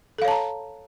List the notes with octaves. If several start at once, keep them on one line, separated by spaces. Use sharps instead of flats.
A4 C#5 F5 A5 A#5